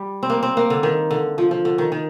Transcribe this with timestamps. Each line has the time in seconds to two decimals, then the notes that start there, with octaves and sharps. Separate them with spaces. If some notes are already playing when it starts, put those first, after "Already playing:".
Already playing: G3
0.23 C4
0.30 A#3
0.43 C4
0.57 A#3
0.70 D3
0.83 D#3
1.11 D3
1.38 F3
1.51 F3
1.65 D3
1.78 D#3
1.92 D#3